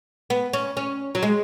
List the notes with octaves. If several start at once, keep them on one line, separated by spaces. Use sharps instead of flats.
B3
C#4
C#4
F#3
G#3